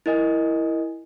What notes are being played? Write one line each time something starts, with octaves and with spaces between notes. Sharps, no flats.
E4 A#4 D#5 G#5